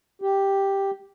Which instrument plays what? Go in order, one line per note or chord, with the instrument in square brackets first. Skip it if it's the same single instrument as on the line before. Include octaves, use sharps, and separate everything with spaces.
[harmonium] G4